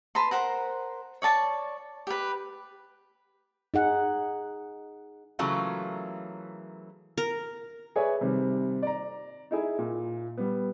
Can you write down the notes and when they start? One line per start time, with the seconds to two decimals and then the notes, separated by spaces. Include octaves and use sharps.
0.15 B4 A5 A#5 C6
0.31 A#4 C5 F#5 A#5
1.22 C#5 D5 A5 C#6
2.07 G4 B4
3.74 D#4 G#4 F#5
5.39 C#3 E3 F#3 A3 A#3 F4
7.18 A#4
7.96 G#4 B4 C#5 D5 E5 G#5
8.21 C3 D#3 G3
8.83 D5 A#5
9.51 D#4 E4 G#4
9.79 A#2
10.37 G3 B3